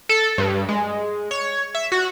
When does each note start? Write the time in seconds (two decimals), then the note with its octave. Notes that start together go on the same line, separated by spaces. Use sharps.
0.09 A4
0.38 G2
0.69 G#3
1.31 C#5
1.75 E5
1.92 F#4